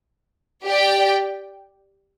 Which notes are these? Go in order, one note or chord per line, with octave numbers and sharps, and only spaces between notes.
G4 D5 G5